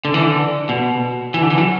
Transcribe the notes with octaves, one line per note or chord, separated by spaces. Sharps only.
D3
E3
D3
B2
E3
D3
E3
F#3